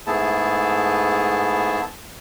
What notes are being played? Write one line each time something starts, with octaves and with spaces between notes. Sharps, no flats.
G#2 A3 B3 E4 G#4 A5